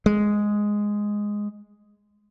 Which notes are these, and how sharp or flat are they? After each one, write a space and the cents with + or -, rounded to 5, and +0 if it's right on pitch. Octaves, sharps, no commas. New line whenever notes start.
G#3 +0